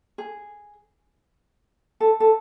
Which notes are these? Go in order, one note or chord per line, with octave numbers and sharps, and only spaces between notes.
G#4
A4
A4